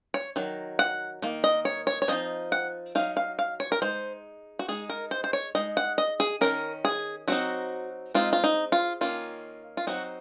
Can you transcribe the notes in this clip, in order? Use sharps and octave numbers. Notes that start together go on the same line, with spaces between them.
C#5
D#3 F#3
F#5
D#3 A#3
D#5
C#5
C#5
C#5
F3 C4 D#4 D#5
F#5
F#3 C4 D#4 F5
F5
F5
C#5
A#4
G#3 D#4 C5
F#4
G#3 D#4 G#4
A#4
C5
C5
C#5
G#3 D#4 D#5
F#5
D#5
G#4
D#3 F#3 C#4 A#4
G#4
F#3 C4 D#4 F#4
G#3 C4 D#4 F4
F4
D#4
F4
D#3 A#3 C#4 F4
F4
F#3 C4 D#4 F#4